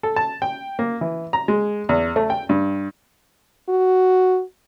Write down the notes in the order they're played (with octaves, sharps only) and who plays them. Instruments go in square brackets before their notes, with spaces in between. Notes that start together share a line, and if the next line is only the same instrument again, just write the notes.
[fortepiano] A4
A5
G5
A#3
E3
A#5
G#3
E2
A3
G5
G2
[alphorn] F#4